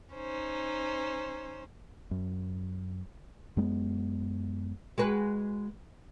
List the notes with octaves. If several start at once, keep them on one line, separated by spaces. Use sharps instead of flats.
C#4 D#4 C5
F#2
F#2 G#3 A3 B3
G#3 F#4 B4